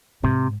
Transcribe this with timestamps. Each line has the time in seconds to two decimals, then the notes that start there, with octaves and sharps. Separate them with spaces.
0.23 G#2 C3